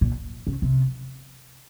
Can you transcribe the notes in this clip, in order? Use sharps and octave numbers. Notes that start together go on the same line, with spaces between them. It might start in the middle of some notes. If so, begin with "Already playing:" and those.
A#2
C#3
C3